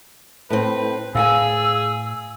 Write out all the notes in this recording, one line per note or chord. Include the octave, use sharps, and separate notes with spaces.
A2 C4 B4
A2 G#4 F5 F#5 G#5 E6